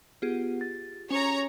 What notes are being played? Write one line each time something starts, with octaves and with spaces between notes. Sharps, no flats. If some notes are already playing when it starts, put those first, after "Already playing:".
B3 F4 G4 G#4
A6
C#4 C#5 A#5